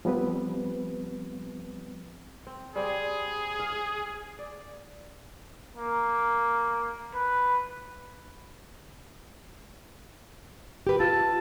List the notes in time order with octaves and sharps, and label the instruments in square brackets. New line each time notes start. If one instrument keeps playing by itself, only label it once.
[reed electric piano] F3 G3 B3 C4 B4
[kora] C4
[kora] G3 C4 [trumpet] G#4
[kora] F5
D5
[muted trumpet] A#3
B4
[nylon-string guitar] G4 B4
[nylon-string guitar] F4 [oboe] A5